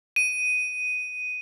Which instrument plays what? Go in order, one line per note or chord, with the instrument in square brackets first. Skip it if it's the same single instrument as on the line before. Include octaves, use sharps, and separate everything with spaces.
[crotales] D#7